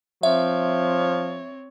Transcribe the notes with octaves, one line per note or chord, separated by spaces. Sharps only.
F3 C4 C#5 E5